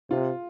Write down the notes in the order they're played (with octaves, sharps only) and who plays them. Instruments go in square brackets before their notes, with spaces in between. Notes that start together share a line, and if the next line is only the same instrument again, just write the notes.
[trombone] C3 [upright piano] F4